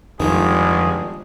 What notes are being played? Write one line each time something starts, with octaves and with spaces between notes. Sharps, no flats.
G1 F2 D#3 F3 G3 G#3 G#4